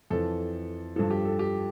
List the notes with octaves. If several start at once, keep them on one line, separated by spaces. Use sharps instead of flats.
F2 E3 A4
G2 F3 A4
G4
A4
G4